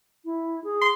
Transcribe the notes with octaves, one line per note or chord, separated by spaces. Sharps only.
E4
G#4
C6